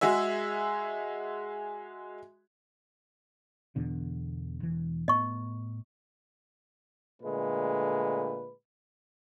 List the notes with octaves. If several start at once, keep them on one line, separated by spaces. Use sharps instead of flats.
G#3 F#4 G#4 E5
E2 B2 D3
E1 E3
A2 B3 D#5 C#6
A#2 D3 G#3 A3 B4